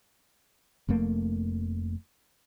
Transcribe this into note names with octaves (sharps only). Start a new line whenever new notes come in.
F1 F2 A3 A#3